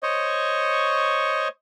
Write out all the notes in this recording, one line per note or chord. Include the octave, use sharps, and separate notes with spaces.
C5 C#5 D#5 C#6